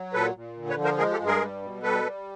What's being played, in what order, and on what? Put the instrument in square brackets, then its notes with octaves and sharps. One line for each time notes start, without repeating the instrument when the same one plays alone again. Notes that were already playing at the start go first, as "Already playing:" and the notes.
Already playing: [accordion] F#3
A#2 A4 B4
A#2
D3
B4 C#5
F3
A#4 C5
G#3 G#4 A#4
G4 A4
G2
G#4 A#4
G3
B2
G3 A4 B4
G3